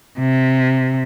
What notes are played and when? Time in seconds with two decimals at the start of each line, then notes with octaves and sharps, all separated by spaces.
0.19 C3